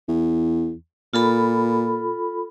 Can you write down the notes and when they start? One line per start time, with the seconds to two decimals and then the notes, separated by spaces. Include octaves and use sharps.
0.09 E2
1.14 A#2 F4 A4 B5